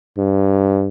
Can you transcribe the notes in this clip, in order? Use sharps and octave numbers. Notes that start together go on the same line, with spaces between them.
G2